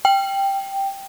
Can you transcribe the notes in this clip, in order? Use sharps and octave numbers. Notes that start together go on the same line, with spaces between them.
G5